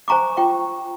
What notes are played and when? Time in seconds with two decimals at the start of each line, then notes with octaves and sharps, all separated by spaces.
0.08 C5 G#5 A#5 C#6 D6
0.37 F4 G5 C#6